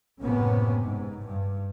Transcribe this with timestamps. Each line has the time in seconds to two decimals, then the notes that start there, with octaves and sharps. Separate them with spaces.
0.22 F#1 A2 C3 A#3 B3 C#4
0.82 G#2
1.25 G2